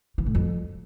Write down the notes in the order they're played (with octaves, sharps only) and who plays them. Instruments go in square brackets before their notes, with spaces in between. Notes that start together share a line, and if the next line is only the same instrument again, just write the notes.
[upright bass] E3
A2
F2